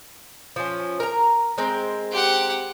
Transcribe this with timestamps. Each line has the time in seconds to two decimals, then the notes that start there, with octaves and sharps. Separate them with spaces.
0.56 F3 C#4
1.00 A#4 A#5
1.58 G#3 C4 A#4
2.12 G4 F#5